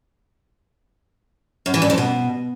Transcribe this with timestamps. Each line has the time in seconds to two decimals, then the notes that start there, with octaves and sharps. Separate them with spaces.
1.66 F#2
1.74 E3
1.82 G2
1.90 F2
1.98 B2